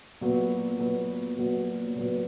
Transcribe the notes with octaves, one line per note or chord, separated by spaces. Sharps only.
A#2 F#3 B3
A#2 F#3 B3
A#2 F#3 B3
A#2 F#3 B3